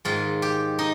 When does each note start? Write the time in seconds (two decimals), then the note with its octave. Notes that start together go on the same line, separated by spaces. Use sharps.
0.05 G#2 D#3 F4
0.42 G4
0.79 D#4